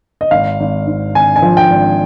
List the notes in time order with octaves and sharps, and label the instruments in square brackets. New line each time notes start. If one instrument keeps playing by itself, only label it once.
[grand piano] D#5
G#1 F5
G#1
G#2
G#1 G#5
G#5
F3
G5
G#1